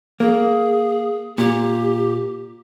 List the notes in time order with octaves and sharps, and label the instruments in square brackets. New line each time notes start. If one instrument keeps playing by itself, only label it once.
[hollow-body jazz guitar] A#3 [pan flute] G#4
[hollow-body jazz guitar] A#2 [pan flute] G4